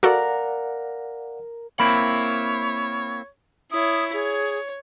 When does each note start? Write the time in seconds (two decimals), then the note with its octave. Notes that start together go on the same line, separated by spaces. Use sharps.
0.03 F#4 A4 A#4 D5 F5 F#5
1.80 A#3 C4 E4 C#5 B5
3.71 E4 C#5 D#6
4.13 G#4 C#5